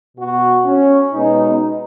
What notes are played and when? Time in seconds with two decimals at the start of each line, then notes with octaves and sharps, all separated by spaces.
0.17 B2 B3 F#4
0.66 C#4
1.13 B2 G#3 B3 D#4